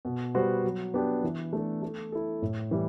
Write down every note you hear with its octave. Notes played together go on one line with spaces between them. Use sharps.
B2
G3 B3 F#4 C5
F#3
B3 D4 G4
E3
A3 D4 A4
A3
E4 A4
A2
E3 G3